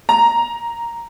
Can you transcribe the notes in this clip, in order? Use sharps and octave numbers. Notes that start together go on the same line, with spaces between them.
A#5